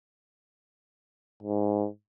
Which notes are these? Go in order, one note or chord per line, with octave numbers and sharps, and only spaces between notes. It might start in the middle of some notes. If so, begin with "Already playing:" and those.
G#2